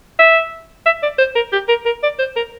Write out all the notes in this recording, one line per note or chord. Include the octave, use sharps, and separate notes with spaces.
E5
E5
D5
C5
A#4
G4
A#4
A#4
D5
C5
A#4